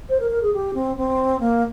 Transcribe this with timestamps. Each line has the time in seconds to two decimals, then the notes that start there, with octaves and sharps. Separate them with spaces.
0.09 C5
0.20 A#4
0.31 A#4
0.42 G#4
0.53 G4
0.74 C4
0.97 C4
1.40 A#3